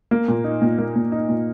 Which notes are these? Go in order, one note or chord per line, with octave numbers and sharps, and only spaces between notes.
A#3
A#2
D#4
A#2
A#3
A#2
D#4
A#2